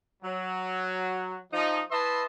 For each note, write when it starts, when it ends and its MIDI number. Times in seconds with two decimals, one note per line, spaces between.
0.23 1.38 54
1.53 1.81 53
1.53 1.81 63
1.91 2.23 64
1.91 2.23 71
1.91 2.23 75
1.91 2.23 76
1.91 2.23 81
1.91 2.23 84